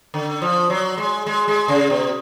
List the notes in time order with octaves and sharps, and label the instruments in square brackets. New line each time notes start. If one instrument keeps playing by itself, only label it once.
[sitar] D3
F3
F#3
G#3
G#3
G#3
C#3
B2